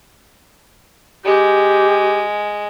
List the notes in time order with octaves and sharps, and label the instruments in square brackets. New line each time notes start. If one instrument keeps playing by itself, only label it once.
[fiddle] G#3 [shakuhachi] G4